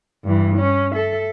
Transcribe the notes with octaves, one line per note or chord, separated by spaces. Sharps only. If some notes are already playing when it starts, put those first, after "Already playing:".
G2 E3
C#4
A4 E5